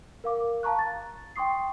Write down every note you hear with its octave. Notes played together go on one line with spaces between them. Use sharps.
A#4 F5 D6
F5 A5 A#5 C#6 F#6
A6
G5 C6 C#6 D#6 C7